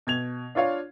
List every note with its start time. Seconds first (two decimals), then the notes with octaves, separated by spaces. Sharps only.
0.07 B2 G#6 F7
0.55 D4 F4 C#5 F5